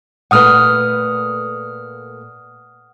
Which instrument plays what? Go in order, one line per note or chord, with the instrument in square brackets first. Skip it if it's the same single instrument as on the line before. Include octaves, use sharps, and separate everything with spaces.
[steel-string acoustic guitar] A#2 A3 B4 [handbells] F#5 D#6 F6